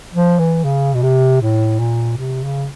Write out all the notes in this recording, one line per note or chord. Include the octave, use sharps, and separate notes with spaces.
F3
E3
C#3
B2
C3
A2
A#2
C3
C#3